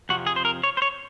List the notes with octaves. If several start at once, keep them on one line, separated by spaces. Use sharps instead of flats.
F2 C3 F3 F#4
G#4
C5
A#4
C#5
C5
C#5